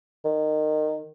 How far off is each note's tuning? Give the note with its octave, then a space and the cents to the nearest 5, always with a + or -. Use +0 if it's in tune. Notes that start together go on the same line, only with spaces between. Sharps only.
D#3 -20